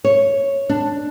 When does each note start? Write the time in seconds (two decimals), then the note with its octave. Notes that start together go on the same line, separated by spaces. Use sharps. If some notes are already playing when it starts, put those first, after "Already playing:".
0.04 C#5
0.69 D4